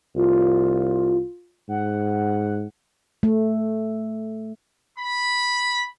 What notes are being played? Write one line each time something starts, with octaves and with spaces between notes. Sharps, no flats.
C2 F4
G#2 F#5
A3
B5